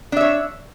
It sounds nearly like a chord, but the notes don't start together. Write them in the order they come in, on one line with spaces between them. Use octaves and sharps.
D4 E5 C#5